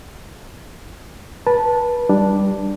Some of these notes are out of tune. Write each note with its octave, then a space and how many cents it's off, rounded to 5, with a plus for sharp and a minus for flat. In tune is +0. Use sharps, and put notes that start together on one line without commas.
B4 -30 A5 +0
G3 +0 D4 +0